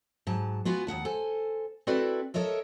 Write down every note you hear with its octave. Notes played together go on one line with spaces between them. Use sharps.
G#2 F#3 A5
B3 F4 F#4 G#5
D#2 G#2 F#5 A5
A4 C5 G#5
C4 E4 F#4 A4 B4 D5
A4 A#4 C#5 D#5 E5